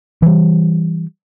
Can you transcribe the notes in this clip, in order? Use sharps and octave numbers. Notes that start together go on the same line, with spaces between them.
E3 G3